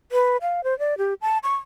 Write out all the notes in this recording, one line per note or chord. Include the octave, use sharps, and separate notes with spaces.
B4
F5
C5
D5
G4
A5
C#6